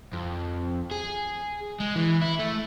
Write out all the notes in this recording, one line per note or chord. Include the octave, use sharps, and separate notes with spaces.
F2
G#4
G#3
E3
E4
A3